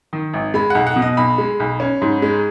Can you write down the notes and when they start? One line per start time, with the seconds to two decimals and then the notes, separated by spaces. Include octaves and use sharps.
0.13 D#3
0.34 G#1
0.54 G#3 B5
0.70 B1 F#5
0.87 F#5
0.96 B2
1.02 D#5
1.17 B1 B5
1.38 G#3
1.60 B1
1.80 C#4
2.02 G#2
2.22 G#3